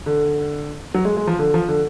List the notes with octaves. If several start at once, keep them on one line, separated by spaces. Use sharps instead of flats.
D3
F#3
G#3
G#3
F3
D3
F3
D3